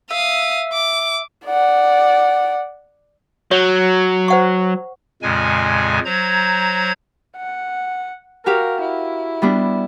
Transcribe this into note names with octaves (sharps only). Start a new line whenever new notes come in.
E5 F5 D#6
D6
D5 F#5
F#3 C#5
C5 F#5 C#6
F2 A#2 C#3 G#3 G#5
F#3 C5 A#5 G#6
F#5
F#4 G4 A#4 F5
E4
G3 B3 D4